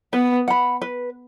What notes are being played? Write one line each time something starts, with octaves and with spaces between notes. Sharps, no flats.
B3 B4
F#5 B5
B4